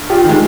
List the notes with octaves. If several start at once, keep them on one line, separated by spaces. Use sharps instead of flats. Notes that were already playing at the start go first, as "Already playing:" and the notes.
Already playing: G2
F4 G4
D#3 G#3